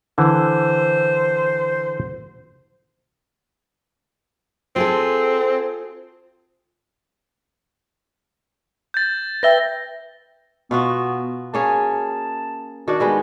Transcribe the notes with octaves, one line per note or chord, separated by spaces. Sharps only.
D3 E3 C5
C4 F4 G#4 A4
G6 A6
B4 E5 G5 A#6 G7
B2 B3 F4 F#4
A#3 C#4 G#4 A5
D#3 D4 F#4
G3 G#3 B3